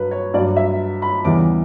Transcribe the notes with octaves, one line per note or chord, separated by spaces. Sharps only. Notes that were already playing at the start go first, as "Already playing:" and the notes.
Already playing: G2 F#3 B4
C#5
G2 F#3 D5
E5
B5
E2 C#3 E3 G3 D6